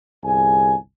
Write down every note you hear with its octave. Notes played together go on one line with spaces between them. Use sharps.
G1 C2 G#4 G#5